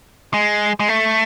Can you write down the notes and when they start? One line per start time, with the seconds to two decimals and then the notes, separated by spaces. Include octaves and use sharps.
0.34 G#3
0.80 G#3
0.89 A3